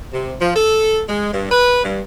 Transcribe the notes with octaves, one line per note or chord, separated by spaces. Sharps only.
C3
F3
A4
G#3
G2
B4
G2